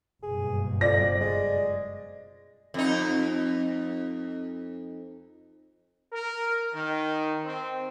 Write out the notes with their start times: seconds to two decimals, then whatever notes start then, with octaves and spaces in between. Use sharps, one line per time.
0.23 F#1 G2 B2 G#4
0.81 F2 D5 A#6
1.21 G#3
2.74 F2 D#4
6.13 A#4
6.74 D#3
7.45 C4